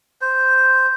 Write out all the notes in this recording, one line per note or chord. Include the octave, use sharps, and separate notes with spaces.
C5